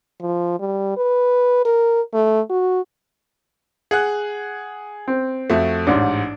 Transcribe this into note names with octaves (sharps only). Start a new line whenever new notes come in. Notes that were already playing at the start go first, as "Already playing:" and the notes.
F3
G3
B4
A#4
A3
F#4
G#4 F#5 F#6
C4
F2 A3 F#4
A1 G#2 D4